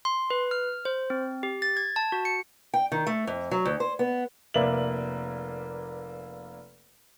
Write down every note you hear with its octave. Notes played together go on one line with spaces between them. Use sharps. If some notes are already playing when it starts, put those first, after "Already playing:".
C6
B4
F6
C5
C4
G4
A6
G#6
A5
F#4
C#7
G5
D#3
A3
F2
F#3
D2
C5
B3
F1 A#3 B4 D5 E5 F#7